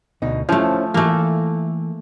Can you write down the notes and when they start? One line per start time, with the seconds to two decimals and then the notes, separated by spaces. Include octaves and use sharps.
0.22 D2 B2 D#4
0.49 F3 A3 C#4 E4 C5
0.94 E3 A3 A#3 A4